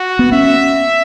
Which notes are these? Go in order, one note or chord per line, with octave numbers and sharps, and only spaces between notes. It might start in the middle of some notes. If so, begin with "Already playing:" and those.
Already playing: F#4
B3
C#4 E5